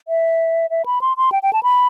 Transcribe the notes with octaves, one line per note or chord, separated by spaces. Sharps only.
E5
E5
B5
C6
C6
G5
G5
A5
B5